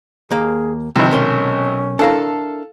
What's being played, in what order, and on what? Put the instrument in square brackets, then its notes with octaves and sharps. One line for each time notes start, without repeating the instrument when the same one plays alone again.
[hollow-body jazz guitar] D#2 A#3 F5 [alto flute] G#4
[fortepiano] G#1 C3 [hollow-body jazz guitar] F3 [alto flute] E4
[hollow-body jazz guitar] B1 A#4 C6 [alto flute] C#4
[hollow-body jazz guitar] D4 E4 A#4 [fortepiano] A4 F5